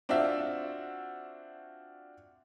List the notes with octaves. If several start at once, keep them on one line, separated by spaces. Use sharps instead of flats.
C4 D4 F4 F#4 E5